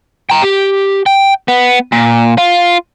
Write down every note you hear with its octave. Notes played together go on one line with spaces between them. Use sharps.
G5 A#5
G4
G5
B3
A#2
F4